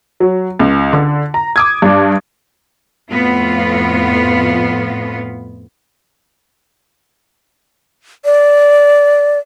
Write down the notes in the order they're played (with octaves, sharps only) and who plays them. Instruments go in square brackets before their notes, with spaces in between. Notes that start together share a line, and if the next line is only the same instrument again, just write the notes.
[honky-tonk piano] F#3
C#2
D3
A#5
D6 D#6 G#6
G2 D4
[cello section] F2 A2 B3 F4
[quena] D5